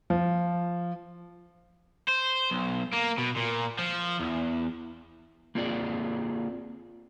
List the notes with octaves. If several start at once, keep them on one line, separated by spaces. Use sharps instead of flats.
F3
C5
B1
A#3
B2
A#2
F3
E2
A#3 C4 F4 G#4 D5